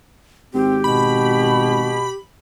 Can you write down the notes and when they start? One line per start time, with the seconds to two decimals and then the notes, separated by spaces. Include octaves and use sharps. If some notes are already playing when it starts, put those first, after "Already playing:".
0.54 G#1 C4 G4
0.84 B2 B5